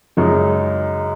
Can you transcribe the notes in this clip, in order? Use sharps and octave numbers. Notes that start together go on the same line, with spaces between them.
F#2 C#3 G#3 D#4